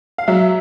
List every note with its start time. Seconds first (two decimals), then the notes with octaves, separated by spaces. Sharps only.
0.18 F5
0.28 F#3 E5